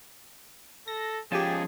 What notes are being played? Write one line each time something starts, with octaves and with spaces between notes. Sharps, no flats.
A4 A#6
F3 C#4 F4 G4 G#4 G#5 A5